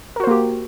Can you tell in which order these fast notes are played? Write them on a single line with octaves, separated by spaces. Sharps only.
A#4 F#4 C5 A#3 G4